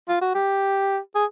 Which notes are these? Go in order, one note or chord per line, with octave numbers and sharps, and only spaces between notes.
F4
F#4
G4
G#4